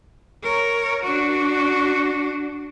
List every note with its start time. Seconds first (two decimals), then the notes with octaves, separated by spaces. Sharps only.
0.43 A#4 C#5
1.03 D4 F#4